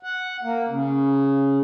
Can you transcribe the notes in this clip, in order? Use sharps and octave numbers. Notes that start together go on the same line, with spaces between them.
F#5
A#3
C#3